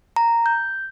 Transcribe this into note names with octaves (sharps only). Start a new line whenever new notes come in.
A#5
G6